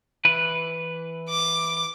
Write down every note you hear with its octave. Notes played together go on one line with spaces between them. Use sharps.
E3 B4
D6